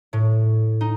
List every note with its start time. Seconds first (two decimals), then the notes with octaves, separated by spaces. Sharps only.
0.13 A2
0.81 D#4